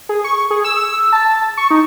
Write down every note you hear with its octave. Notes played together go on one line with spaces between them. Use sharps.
G#4
C#6
G#4
E6
A5
C#6
D#4